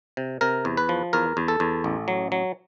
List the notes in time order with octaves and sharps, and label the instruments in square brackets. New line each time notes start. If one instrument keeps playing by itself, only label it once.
[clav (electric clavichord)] C3
C3 A#4
E2
B4
F3
E2 A#4
E2
A4
E2
A1
F#3
F#3